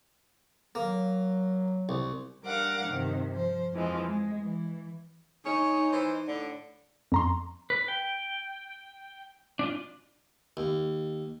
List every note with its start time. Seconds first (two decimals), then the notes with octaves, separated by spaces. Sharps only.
0.75 F#3 A#3
1.89 C2
2.45 G3 D4 A#4 F5 F#5 D6
2.87 G2 C3 D#3
3.33 F3 C5
3.73 F2 E3 F3 G#3
4.08 G#3
4.42 E3
5.44 D#4 G#4 C#5
5.92 E3 C5
6.27 A2 D3
7.12 F2 A#5 C6
7.70 B4
7.88 G5
9.59 D4 D#4 F4
10.57 D#2